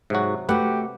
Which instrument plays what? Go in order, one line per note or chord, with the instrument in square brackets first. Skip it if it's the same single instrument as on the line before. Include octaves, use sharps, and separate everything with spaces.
[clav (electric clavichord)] G#2 F#4 [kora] C3 F#3
[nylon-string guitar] A3 F#4 [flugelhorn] G4 [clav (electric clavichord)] B4 F#5